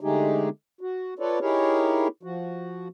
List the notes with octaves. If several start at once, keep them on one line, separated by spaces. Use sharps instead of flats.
D3 G#3 A3 D#4 G4 G#4
F#4
F4 A4 B4 C#5 D5
D#4 E4 G4 G#4 A#4 C#5
F3 F#4